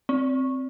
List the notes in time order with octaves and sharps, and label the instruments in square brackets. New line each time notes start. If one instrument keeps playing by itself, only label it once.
[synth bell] C4